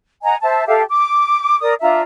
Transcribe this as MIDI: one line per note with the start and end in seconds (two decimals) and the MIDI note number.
0.23 0.35 75
0.23 0.35 78
0.23 0.35 80
0.23 0.35 82
0.42 0.65 72
0.42 0.65 76
0.42 0.65 81
0.67 0.81 67
0.67 0.81 69
0.67 0.81 76
0.67 0.81 77
0.88 1.58 86
1.61 1.73 70
1.61 1.73 74
1.61 1.73 87
1.81 2.01 62
1.81 2.01 65
1.81 2.01 76
1.81 2.01 82